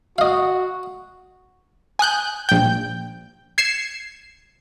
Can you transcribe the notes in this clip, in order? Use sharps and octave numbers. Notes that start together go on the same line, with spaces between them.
F#4 D#5 F5
G#5 D#6 F#6 G6
A#1 G5
G#6 C7 C#7 E7